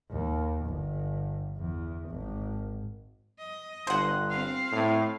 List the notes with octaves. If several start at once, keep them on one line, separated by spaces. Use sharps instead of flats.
D#2
G1
E2
G#1
D#5
G1 C5 F#5
C4 F5
A2